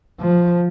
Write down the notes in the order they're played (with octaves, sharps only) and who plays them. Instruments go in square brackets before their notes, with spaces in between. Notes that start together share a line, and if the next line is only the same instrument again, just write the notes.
[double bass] F3